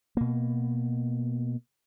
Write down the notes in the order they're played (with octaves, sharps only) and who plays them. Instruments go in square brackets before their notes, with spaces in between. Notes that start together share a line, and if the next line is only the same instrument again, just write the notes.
[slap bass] B2 A#3